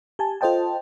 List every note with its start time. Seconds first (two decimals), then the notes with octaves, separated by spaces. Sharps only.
0.19 G4 G#5 A5
0.41 F4 A4 C5 D#5 G5 A5